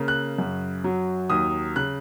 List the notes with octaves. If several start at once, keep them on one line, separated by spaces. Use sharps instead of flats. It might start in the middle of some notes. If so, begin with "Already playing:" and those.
Already playing: C#3 A#3
F#6
F#2
F#3
D#2 D#6
C#3 F#6